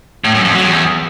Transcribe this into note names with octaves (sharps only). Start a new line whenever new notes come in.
A2
F#2
F2
F#3
E2